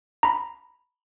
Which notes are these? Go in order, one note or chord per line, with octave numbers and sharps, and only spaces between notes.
A#5 B5